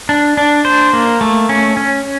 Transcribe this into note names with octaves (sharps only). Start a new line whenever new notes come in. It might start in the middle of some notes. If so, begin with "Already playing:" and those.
D4
D4
C5
A#3
A3
C#4
C#4